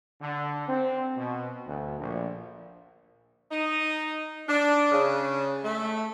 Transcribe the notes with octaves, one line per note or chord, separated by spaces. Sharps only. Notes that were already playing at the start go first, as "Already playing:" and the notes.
D3
C4
B2
D2
A#1
D#4
D4
C#3
A3